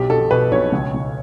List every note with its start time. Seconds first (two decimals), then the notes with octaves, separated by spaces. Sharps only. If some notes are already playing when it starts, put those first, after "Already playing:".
Already playing: B1 G4
0.10 B2 A4
0.31 B2 B4
0.51 B1 C#5
0.72 C#2
0.94 C#2